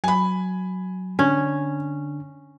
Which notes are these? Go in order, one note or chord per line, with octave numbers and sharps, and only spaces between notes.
F#3 G#5 B5
D3 C#4 D4